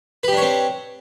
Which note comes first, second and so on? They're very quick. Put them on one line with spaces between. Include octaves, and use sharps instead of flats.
B4 G4 D4 C#5 C4